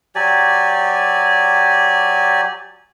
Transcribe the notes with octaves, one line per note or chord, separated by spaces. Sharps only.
F#3 G4 D5 G#5